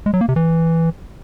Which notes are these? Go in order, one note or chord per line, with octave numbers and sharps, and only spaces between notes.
G#3
F#3
A#3
C3
E3